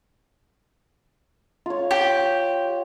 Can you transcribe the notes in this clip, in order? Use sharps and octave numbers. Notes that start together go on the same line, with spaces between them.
F4 C#5
G4